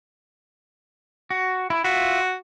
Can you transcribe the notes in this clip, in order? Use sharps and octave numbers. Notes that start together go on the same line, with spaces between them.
F#4
E4
F4 F#4 E5